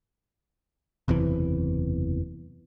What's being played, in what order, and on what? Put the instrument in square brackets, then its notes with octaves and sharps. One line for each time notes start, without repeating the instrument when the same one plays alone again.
[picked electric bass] F#1 E2 C3 E3